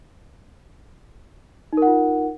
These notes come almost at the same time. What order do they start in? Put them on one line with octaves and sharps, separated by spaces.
D#4 A#4 F#5 F4